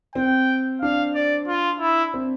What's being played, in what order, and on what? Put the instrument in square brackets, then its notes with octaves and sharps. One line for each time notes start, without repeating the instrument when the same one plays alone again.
[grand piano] C4 [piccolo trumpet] G5
[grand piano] D4 [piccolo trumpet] F5
[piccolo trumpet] D5
F4
E4
[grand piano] C4